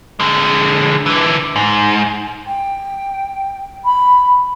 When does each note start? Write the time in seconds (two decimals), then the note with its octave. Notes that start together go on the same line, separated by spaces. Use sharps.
0.20 D3 G#3
1.06 D3 E3
1.56 G#2
2.47 G5
3.85 B5